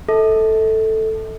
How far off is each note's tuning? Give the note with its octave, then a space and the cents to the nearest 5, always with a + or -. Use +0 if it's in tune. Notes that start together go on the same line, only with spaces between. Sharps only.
A4 +0 E5 -45